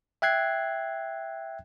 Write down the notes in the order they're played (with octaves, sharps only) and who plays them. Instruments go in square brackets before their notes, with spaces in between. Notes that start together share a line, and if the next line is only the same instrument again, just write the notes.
[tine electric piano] E5 G5 F#6 G#6 C7